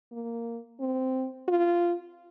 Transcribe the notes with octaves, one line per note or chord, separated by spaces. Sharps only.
A#3
C4
F4